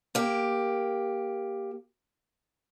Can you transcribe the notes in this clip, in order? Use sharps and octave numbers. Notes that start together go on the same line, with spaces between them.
A#3 G4